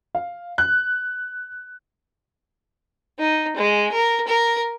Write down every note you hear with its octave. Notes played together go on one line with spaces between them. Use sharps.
F5
F#6
D#4
G#3
A#4
A#4